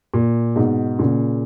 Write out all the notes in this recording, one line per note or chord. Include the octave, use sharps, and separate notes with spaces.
A#2
G#2 B2
A#2 C#3